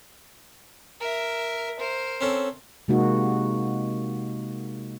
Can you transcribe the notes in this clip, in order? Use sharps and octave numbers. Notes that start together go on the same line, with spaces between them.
A#4 E5
A#4 C5
C4 C#4 A4
C3 G#3 A#3 D#4 F#4